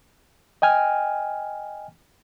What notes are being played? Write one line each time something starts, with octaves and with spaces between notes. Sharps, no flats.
D#5 G5 G#5 F6